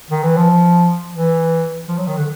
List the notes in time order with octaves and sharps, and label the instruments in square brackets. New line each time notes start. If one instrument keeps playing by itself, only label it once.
[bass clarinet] D#3
E3
F3
E3
F3
F#3
D#3
D3